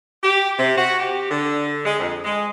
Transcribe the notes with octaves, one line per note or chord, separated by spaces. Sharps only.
G4
C3
F#4
G4
D3
G#3
F2
G#3